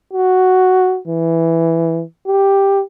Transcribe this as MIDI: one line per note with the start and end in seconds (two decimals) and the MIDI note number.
0.13 0.99 66
1.08 2.02 52
2.27 2.82 67